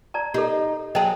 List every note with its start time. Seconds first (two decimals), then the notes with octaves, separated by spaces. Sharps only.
0.14 D5 A5 A#5
0.34 D#4 G4 A4
0.95 F#3 G#4 D#5 G5 A5